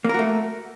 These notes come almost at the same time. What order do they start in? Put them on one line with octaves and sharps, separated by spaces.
A#3 A#4 F#4 A3